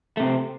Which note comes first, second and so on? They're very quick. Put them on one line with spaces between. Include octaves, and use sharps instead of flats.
A3 C3 C4